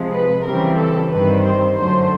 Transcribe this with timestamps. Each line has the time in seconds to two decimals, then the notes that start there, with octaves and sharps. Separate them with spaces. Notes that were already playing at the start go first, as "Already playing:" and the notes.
Already playing: C3 F3 G#3
0.13 B4
0.46 C#3 E3 G3 C4 A#4
0.79 A4
1.12 G2 D#3 G3 C4 B4
1.45 C5
1.78 F#2 D3 F#3 A3 C5